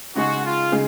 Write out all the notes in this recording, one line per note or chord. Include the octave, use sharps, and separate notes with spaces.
C#3 G#3 D#4 F#4 G#4
F4
C#3 G#3 D#4 G#4